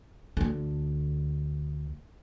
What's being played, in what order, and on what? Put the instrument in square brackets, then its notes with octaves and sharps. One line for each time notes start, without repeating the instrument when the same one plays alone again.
[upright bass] D2 D3